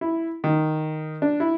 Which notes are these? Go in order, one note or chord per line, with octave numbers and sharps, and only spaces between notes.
E4
D#3
D4
E4